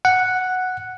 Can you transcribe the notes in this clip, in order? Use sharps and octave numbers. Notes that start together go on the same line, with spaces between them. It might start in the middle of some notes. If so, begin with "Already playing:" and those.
F#5